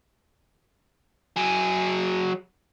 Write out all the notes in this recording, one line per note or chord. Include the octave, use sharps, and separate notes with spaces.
F#3 G#4